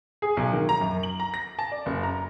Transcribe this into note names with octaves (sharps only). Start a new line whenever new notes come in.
G#4
B1
D#3
A#5
F#2
F#7
A#5
A#6
A5
D5
F#1
A#5